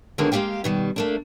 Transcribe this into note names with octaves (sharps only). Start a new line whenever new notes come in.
B2 D3 D#3 F#3 G#3 A#3
G#3 A#3 C#4 G4 F5 G5
B2 D#3 G3
A3 A#3 D4